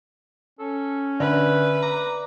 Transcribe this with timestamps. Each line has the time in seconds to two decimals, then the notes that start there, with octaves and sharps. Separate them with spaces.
0.59 C#4 A4
1.20 D3 B4 E5
1.83 D5 A#5